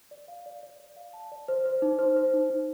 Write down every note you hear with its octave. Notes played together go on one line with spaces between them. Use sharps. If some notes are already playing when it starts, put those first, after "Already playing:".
D5
F5
D5
D5
D5
F5
A5
D5
C5
C5
D#4
C5
C5
D#4
D#4